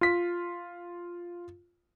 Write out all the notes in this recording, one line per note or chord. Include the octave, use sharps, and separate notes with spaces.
F4 B6